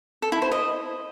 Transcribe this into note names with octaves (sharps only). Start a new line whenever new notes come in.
A4
E4
C5
D#5